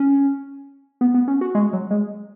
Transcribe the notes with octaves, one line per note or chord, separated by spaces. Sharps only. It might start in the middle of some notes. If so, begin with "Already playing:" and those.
Already playing: C#4
B3
B3
C#4
F#4
G#3
F#3
G#3